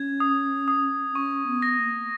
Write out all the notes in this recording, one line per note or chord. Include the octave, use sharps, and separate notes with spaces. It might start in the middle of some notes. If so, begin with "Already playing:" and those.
Already playing: C#4 G#6
D#6
D#6
C#4 C#6
B3
A#6
A#3